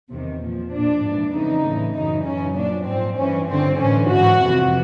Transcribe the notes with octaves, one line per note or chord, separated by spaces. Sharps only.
E2 C3 D#3
A#2 F3
A#2 F3 D4
G#2 E3
F2 C#3 E3 D#4
A2 E3
F#2 C#3 E3 D#4
F#2 C#3 E3 C#4
A#2 F3 D4
G#2 F3 C4
G2 E3 C#4
G2 D3 F3 C4
A2 E3 C#4
G#2 E3 F#4
F2 C3 E3